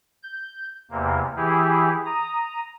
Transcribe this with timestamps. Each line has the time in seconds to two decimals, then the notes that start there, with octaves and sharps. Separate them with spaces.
0.23 G6
0.91 E2 C3 A#3
1.36 E3 E4 G4 G#4
2.06 A#5 D#6